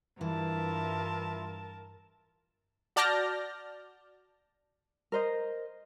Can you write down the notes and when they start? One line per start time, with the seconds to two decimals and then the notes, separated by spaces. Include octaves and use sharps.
0.21 G2 E3 E4 F4 A#4 E5 A5
2.96 F#4 D5 A5 F6 G6 A#6
5.12 A#4 C5 D#5